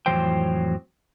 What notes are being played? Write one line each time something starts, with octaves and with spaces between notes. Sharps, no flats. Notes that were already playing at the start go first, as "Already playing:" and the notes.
F2 A2 E3 F#3 C5 G5